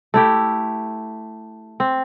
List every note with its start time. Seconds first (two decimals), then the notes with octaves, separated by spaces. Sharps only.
0.14 A3 E4 G4
1.80 C4